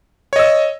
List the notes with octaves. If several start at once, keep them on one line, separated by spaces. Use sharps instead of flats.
C#5 D#5 E6